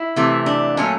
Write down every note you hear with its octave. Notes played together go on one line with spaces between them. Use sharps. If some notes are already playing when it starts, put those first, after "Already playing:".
Already playing: E4
C3 E3 A3
D4
A#2 F#3 A3 C#4